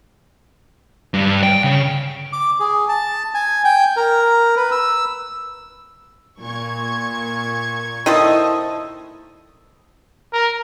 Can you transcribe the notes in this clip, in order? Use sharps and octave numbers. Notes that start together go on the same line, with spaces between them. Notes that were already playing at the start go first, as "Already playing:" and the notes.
G2
G5
C#3
D6
G#4
A5
G#5
G5
A#4
B4
E6
A#2 C#6 G#6
D#3 F3 E4 A4 D#5
A#4